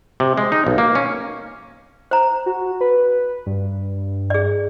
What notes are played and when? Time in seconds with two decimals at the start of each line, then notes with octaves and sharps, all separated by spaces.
0.20 C3
0.37 G#3
0.52 D#4
0.67 B1
0.78 A#3
0.95 C#4
2.11 C5 A#5
2.46 F#4
2.81 B4
3.46 G2
4.30 G#4 D5